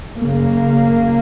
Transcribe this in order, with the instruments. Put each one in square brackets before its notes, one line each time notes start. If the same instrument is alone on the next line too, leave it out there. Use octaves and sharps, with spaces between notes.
[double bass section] F#2 C#3 A#3